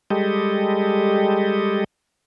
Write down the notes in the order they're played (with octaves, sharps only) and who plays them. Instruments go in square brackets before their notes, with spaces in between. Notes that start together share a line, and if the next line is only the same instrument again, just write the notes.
[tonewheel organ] G3 G#3 G4 A4 D#5